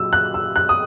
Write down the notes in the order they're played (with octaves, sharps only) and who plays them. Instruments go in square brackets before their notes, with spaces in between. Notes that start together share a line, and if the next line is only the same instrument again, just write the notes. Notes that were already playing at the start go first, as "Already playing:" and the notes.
Already playing: [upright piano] A#2 F#3 E6
F#6
E6
F#6
D#6